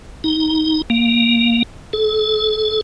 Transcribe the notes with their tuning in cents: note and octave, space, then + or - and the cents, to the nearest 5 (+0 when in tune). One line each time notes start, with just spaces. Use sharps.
D#4 +15
A#3 +5
A4 -35